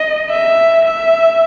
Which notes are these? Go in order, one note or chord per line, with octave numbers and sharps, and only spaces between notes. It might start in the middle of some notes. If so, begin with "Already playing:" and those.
Already playing: D#5
E5
E5